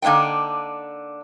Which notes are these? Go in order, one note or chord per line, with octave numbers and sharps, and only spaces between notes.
D3 A#3 D4 D#4 G5